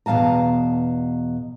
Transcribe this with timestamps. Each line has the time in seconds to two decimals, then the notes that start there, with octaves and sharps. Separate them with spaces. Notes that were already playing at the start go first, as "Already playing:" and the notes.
0.06 E2 B2 F#3 F5 A5 A#5